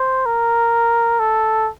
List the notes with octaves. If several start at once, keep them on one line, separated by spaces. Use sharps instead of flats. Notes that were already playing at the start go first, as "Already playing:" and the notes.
Already playing: C5
A#4
A4